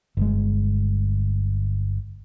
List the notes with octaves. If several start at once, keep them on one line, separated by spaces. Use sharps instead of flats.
G1 G#3